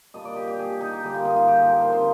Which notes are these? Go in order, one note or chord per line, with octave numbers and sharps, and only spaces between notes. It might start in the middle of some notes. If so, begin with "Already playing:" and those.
A#2 G3 D4 D#5
D5
G4
G4
G#4
G4
D#4
G4
D3 G3 A#3 D#4 G#4
F4
D#4
F4
G4
G#4
A#4
C5
D3 F3 C4 C5